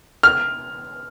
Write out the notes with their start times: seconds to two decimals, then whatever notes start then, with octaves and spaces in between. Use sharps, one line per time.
0.23 F6